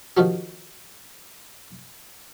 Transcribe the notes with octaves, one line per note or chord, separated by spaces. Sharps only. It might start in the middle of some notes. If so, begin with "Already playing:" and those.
D#3 F3 F#4 G4